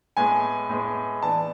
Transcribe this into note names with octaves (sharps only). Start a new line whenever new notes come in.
A2 G#3 B3 G#5
A2 G#3 B3
E3 B3 D4 A5